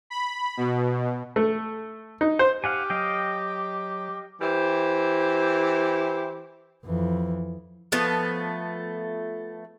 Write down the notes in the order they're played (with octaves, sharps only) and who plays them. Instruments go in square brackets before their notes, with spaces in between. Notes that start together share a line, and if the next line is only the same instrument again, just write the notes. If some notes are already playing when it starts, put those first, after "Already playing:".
[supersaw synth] B5
B2
[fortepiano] A3
D#4
C5
[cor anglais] G4 [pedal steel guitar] F5 F#5 G#5
[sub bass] F#3 [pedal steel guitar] D#5 F5 G5
[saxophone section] E3 E4 G4 C5
[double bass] F2 E3
[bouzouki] F3 A3 B3